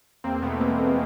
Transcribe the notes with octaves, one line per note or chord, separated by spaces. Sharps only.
E2 A#3 C4
B2 A3 B3
G#3 A#3
E2